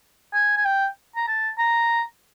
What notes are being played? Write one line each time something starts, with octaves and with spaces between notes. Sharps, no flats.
G#5
G#5
G5
A#5
A5
A#5